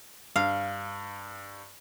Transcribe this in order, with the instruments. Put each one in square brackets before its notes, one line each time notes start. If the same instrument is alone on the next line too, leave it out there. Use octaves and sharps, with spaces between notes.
[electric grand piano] G2 [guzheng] F5